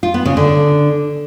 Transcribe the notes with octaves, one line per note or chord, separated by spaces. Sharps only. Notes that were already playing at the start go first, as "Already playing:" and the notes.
F4
B3
C#3
D3